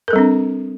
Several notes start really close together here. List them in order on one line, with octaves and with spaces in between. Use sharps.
A#4 A4 G3 C4 D4